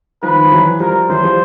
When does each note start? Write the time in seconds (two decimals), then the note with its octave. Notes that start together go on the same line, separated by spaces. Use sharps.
0.22 D#3 F3 B4
0.45 F3
0.52 E3 F#3
0.80 F3 G3 A#4
1.09 E3 F#3 C5
1.24 F3 G3